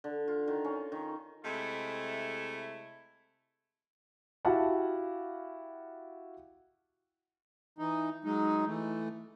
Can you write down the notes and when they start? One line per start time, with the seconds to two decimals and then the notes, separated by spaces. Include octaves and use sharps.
0.04 D3
0.28 F4
0.48 D#3
0.64 C#4
0.92 D#3
1.44 C3 G#3 A3 E4
4.45 E4 F#4 G4 F5 F#5 A5
7.79 E3 D#4
8.25 F#3 G#3 D#4
8.66 E3 A3